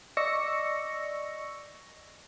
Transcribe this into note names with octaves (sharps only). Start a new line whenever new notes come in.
D5 D#5 C#6 E6 A#6 C#7